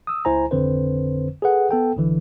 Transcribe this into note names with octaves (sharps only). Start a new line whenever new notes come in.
D#6 E6
C#2 E4 C5 G#5 A#5
G#1 F2 D3 C4 B4 C5
G#4 A4 B4 F#5
B3 A4 G5
B1 D3 E3